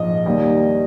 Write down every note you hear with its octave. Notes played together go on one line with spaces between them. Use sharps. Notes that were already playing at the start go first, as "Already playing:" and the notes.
Already playing: A#1 G#2 F3 G#3 D#4 D#5
D#2 D#3 G3